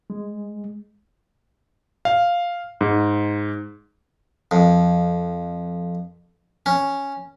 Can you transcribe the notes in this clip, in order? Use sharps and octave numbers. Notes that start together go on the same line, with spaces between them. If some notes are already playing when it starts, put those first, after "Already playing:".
G#3
F5
G#2
F2
C#4